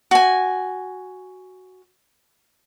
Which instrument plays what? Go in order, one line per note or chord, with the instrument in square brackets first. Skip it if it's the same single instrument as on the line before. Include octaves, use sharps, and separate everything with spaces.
[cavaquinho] F#4 G#5